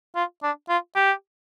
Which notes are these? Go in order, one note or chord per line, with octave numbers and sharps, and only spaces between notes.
F4
D4
F4
G4